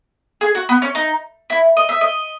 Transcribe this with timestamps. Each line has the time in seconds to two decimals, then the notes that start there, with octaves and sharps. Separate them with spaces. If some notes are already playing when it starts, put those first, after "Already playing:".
0.41 G#4
0.55 F#4
0.69 B3
0.82 C#4
0.95 D#4
1.50 E4
1.77 D#5
1.89 E5
2.01 D#5